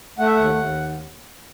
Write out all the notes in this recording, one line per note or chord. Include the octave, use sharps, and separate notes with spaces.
A3 F#5
E5
D#2 F#5
D#2